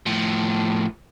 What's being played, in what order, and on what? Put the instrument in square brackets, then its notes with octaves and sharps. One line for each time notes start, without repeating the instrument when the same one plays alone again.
[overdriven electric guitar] A2 F3